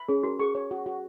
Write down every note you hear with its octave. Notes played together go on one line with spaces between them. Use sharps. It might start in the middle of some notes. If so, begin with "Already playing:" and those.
Already playing: B5
C#4 G#4
F#4 A#4
G#4 C#6
C#5
F#4
F#4